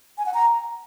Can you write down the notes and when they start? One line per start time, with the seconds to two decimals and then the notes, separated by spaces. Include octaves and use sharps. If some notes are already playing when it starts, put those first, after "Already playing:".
0.18 G#5
0.26 F#5
0.34 A#5